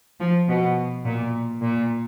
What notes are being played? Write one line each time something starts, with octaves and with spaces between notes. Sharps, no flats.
F3
B2
A#2
A#2